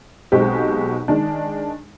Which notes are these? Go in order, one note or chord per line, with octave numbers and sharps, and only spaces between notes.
B1 B2 G#3 C4 G4
D#3 G#3 D4